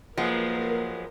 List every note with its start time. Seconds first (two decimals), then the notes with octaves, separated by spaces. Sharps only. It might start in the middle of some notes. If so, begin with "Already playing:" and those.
0.18 F3 F#3 G#3 A#3 B3 A#4 B4